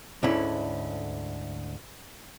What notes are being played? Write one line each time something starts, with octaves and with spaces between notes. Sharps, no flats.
D2 G#2 D3 C#4 E4